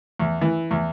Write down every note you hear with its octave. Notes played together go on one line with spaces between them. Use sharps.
E2
E3
E2